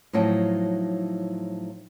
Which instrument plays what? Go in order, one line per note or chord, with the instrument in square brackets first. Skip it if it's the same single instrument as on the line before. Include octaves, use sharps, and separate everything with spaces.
[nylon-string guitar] A2 F3 F#3 D#4 G5 A5